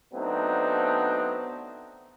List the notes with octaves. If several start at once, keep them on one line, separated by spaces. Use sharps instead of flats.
F#3 A3 B3 C4 D4 D#4